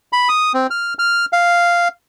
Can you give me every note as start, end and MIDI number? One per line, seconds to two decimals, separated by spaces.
0.13 0.29 83
0.29 0.52 87
0.54 0.67 60
0.70 0.94 89
0.99 1.25 89
1.33 1.88 77